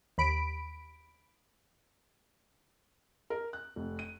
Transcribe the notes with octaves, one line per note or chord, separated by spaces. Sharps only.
D#2 B5 D7
A#4
F#6
F1
D#7